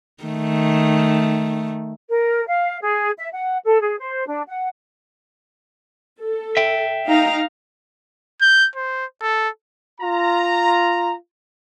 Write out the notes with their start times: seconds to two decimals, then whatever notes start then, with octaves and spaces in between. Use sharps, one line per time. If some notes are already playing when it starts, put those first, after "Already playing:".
0.24 D#3 A3
2.08 A#4
2.47 F5
2.81 G#4
3.17 E5
3.32 F#5
3.64 A4
3.81 G#4
3.99 C5
4.26 D4
4.46 F#5
6.21 A4
6.57 E5 G5
7.07 D#4 F5 A#5
8.42 G6
8.76 C5
9.22 A4
10.01 F4 A#5